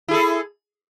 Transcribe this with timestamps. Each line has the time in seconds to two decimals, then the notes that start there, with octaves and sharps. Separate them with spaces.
0.08 E4
0.11 G#4
0.14 A4